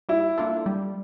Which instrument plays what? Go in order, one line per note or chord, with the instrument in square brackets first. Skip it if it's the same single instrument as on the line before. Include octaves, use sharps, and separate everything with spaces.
[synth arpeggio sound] G3 [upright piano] E4
[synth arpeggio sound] A#3 D4 F4 A4
G3